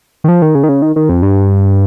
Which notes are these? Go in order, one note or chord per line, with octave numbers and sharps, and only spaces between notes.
D#3
F3
D#3
C#3
D#3
C#3
D#3
D#3
F2
G2